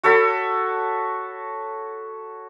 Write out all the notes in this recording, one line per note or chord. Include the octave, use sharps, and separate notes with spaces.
F#4 A4 C#5 B5